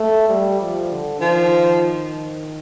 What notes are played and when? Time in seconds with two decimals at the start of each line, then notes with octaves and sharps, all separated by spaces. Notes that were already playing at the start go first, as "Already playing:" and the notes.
Already playing: A3
0.30 G3
0.61 F3
0.91 D3
1.21 D#3 F3